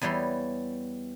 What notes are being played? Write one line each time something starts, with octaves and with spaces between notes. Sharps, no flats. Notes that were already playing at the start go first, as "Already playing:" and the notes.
E2 E3 G3 C#5 C6